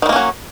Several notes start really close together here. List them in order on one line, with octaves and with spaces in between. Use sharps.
D#3 G3 A#3 C#4 F#3